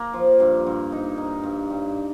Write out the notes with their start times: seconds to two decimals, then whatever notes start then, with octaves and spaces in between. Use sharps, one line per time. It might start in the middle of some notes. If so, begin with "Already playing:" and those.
Already playing: A#3
0.13 F3
0.40 G2
0.67 G2
0.92 D#4
1.18 D#4
1.43 G2
1.70 G2